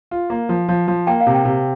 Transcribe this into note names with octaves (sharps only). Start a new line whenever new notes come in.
F4
A#3
F3
F3
F3
A#3 G5
F5
C3
G5
C3